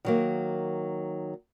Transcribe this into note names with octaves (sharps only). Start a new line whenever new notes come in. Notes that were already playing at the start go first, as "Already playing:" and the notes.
D#3 F#3 A#3